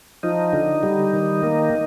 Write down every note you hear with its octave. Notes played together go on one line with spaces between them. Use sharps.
F3 D#4
D3
G3
D#3
A#3